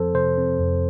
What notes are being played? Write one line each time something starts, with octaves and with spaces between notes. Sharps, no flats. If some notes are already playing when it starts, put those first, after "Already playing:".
Already playing: F2 F3 C4 A4 C5
C3 C5
C4
F2